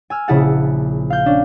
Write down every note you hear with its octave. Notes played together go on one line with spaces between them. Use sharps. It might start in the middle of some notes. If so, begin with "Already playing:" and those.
G#5 E6 F6
A#1 C#3 E4 G#4 F#5 A5
F5 G6
C#4 D4